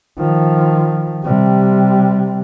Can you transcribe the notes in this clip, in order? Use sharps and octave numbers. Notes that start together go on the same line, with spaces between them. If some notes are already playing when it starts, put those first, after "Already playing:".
D#3 F3
C3 G3